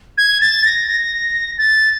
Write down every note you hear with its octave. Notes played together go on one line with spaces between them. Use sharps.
G#6
A6
A#6
A#6
A6